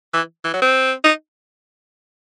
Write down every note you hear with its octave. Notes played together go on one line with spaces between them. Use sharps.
E3
E3
F#3
C4
D#4